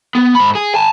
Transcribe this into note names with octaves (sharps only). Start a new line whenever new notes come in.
B3
G#2 B5
G#4
G#5 A5